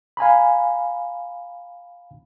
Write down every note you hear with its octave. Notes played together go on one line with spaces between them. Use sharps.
F5 G#5 A#5 B5